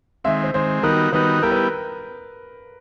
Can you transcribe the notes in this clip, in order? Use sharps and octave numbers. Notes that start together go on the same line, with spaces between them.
D#3 G#3 C4 E5
C5
D#3 G#3 C4 C5
D#3 G3 B3 D#4 F#4 A#4
D#3 G3 B3 D#4 F#4 B4
G3 B3 E4 G4 A#4
B4